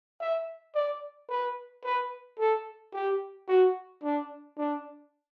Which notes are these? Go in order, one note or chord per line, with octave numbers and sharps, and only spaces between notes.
E5
D5
B4
B4
A4
G4
F#4
D4
D4